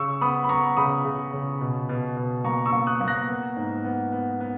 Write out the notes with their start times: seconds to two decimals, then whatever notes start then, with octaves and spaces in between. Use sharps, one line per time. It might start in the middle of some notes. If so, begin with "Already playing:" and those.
Already playing: C#3 C#6 E6
0.21 B3 B5 D#6
0.44 B5
0.49 B3 A#5 C#6
0.77 C#3 B5 D#6
1.05 C#3
1.33 C#3
1.61 B2
1.89 B2
2.17 B2
2.45 A#3 A#5 C#6
2.65 C#6 E6
2.72 A#3
2.87 D#6 F#6
3.01 A#3
3.08 F#6 A#6
3.29 B3
3.56 G#2
3.84 B3
4.12 B3
4.40 B3